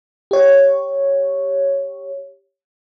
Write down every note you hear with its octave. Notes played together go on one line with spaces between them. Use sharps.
G4 C#5